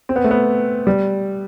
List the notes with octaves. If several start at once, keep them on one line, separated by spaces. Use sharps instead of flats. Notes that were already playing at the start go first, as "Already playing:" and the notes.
C4
B3
A3
B3
G3